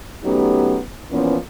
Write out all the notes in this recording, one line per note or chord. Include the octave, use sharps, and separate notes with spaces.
F#3 A3 B3 C#4 D#4 G4
A#2 E3 F3 B3 C#4